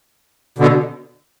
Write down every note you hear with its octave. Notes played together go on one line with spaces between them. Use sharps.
B2 D3